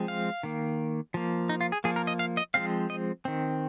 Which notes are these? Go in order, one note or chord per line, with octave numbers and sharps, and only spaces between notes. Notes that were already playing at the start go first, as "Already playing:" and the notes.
Already playing: F3 G#3 C4
F5
D#3 A#3
F3 A#3
D#4
F4
G#4
F3 A#3 G#4
A#4
D#5
F5
D#5
F3 G#3 C4 F5
D#5
D#3 C4